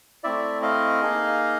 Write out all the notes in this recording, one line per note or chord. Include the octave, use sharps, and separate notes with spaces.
A3 C4 E4 D5 E5
D#5 F5
A#3 D#4 G#4